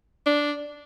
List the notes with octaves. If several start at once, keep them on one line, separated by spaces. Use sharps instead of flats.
D4